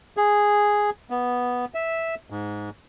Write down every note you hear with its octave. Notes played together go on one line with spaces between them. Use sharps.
G#4
B3
E5
G#2